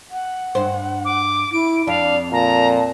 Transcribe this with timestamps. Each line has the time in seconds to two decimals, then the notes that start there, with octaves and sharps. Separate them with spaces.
0.11 F#5
0.55 G2 C5
1.04 D6
1.52 E4 D7
1.87 F2 D4 D5 F5
2.32 A#2 A5 A#5